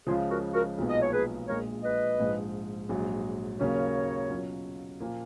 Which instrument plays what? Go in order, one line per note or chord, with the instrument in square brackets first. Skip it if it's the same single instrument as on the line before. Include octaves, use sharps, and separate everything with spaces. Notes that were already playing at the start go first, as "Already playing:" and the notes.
[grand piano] C#2 C#3 F3 [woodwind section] F4 G#4
[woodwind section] F#4 A#4
F#4 A#4
[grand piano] B1 A#2 F3 G#3 B3
[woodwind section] D#5
C#5
G#4 B4
[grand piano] A#1 A#2 F3 G#3 [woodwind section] A#4 C#5
[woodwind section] B4 D#5
[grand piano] A#1 G#2 F3
A#1 G#2 F#3
[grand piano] D#2 C#3 F#3 A#3 C#4 [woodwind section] A#4 C#5
[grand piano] B2 F#3 C#4 F4
A#2 F3 A#3